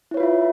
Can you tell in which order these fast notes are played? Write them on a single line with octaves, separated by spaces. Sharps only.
E4 C#5 B4 F4 E5